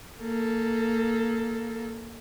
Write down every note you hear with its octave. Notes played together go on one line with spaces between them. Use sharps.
A#3 A4